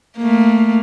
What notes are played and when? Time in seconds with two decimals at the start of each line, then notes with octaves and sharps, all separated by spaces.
0.18 A3 A#3